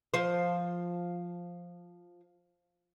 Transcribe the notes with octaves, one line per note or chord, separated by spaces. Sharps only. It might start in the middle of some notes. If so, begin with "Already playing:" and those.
F3 C5